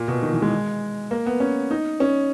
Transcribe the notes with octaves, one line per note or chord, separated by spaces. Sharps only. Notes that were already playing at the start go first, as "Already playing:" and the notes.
Already playing: A#2
B2
D#3
E3
G#3
A#3
B3
C#4
D#4
C#4